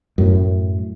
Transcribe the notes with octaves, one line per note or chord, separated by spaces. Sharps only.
F#2 A2